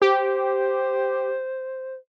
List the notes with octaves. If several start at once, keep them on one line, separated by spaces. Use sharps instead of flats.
G4 C5